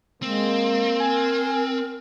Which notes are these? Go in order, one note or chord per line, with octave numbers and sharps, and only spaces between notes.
G#3 A#3 C4
A#4 G#5